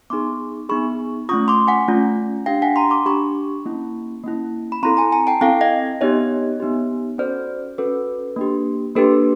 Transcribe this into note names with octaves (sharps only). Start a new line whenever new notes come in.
B3 D#4 G#4 C6 D6
B3 D#4 G#4 B5 C#6
A3 C#4 F4 C#6 D#6
C6 D6
F#5 G#5
A3 C#4 F4
D4 G4 F5 G5
F#5 G#5
A#5 C6
C6 D6
D4 G4 B5 C#6
A#3 C#4 E4
A#3 C#4 E4
B5
C4 E4 A4 A#5 C6
G#5 A#5
G#5 A#5
G5 A5
C4 E4 A4 F5 G5
D#5 F5
B3 D#4 G4 C#5 D#5
B3 D#4 G4
C#4 F#4 A4 C5 D5
C#4 F#4 A4 B4
A#3 D4 G4
A#3 D4 G4 A4 B4